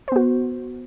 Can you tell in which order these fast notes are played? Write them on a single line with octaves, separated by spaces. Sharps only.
C5 B3 F#4